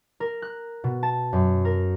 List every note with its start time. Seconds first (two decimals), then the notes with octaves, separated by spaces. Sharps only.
0.20 A#4
0.42 F#6
0.84 B2
1.03 A5
1.33 F#2
1.65 A#4